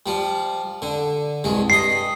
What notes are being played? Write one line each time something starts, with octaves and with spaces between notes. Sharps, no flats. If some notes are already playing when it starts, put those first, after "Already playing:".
F3 G3
D3
C2 G2 G#3
G2 D#5 C7